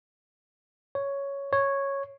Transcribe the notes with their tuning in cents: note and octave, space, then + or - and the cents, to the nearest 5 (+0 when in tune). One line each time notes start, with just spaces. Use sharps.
C#5 +5
C#5 -5